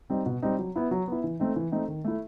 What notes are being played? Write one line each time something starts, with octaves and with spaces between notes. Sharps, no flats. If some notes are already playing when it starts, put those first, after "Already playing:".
G3 C4 D#4
B2
G3 C4 D#4
F#3
B3 E4
F#3
B3 E4
E3
A3 C4 D#4
E3
A3 C4 D#4
D#3
A3 E4